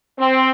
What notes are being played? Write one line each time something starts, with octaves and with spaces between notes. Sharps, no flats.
C4